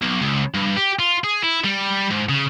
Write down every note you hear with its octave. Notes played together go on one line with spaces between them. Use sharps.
B1
C#2
G2
G4
F4
G#4
E4
G3
G#2
C#3